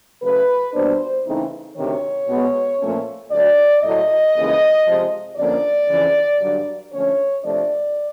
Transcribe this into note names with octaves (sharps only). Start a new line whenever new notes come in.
C#3 F#3 A3 B4
B2 G3 A#3 D4 C5
C#3 E3 A3 C4 D#4
D2 C3 D#3 C#5
B2 G#3 B3
A#2 F3 A3 C#4
D2 D3 F#3 D5
A2 F#3 A3 D#5
D#2 C#3 E3 G#3
C3 F3 G#3
F2 D3 F3 A#3 C#4 D5
F2 C#3 E3
G2 D3 F#3
D3 F3 A3 C#4 C#5
C3 F3 A3 D4 D5